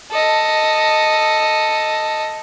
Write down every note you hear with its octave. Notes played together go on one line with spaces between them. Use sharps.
A4 D#5